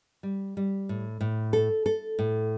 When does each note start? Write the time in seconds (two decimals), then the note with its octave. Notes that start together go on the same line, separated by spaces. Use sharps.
0.23 G3
0.57 G3
0.89 A2
1.21 A2
1.53 A4
1.86 A4
2.19 A2